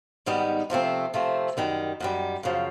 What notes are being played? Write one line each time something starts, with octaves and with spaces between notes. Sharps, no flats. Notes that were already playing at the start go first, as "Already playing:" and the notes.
G#2 D#3 G3 B3 D#4
C3 F3 A3 C4
C3 F3 A3 C4
F#2 D#3 G3
F#2 D#3 G3
F#2 C#3 F3